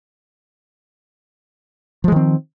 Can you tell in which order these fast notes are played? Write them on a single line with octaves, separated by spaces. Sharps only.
F3 G#3 D#3 C4